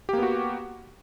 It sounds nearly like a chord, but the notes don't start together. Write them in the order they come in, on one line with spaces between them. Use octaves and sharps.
G4 A#3 B3 F#4